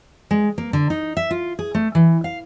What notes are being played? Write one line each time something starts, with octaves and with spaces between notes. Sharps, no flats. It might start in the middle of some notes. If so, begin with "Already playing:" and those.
G#3
A#3
D3
D#4
E5
F4
G#4
A3
E3
F5